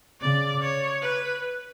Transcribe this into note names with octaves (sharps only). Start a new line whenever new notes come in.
C#3 D5
C#5
B4